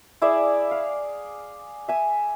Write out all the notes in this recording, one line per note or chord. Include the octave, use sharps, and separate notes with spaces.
E4 G#4 D5 E5
F5
E5 G#5